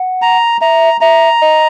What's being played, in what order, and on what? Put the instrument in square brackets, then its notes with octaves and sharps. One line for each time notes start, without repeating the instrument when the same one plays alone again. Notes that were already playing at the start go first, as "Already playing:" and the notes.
Already playing: [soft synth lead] F#5
[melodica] A#5
[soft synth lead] E5 [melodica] A#5
[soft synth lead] E5 [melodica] A#5
[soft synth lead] D#5